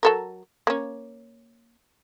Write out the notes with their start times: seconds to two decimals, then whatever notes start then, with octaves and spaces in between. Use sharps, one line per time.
0.03 F#3 A4 A#4
0.67 A#3 C#4